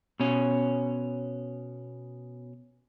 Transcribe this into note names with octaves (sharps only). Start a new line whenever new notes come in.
B2 C#4